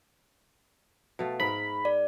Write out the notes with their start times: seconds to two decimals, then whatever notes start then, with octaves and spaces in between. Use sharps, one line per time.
1.19 B2 A3 F5
1.40 G#2 A#4 B5
1.85 D5